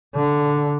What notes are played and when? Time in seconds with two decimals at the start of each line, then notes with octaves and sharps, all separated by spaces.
0.15 D3